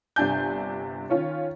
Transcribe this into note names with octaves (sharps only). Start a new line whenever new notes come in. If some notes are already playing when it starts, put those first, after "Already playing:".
G1 C3 D4 G#5 G6
D#3 C#4 F4 C#5